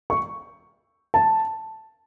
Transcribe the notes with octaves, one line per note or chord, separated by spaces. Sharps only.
C#6
A5